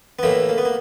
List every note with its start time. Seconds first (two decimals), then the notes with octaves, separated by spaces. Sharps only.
0.19 B3
0.23 A2 E3 A3 A#3
0.49 A#3
0.58 B3
0.65 A#3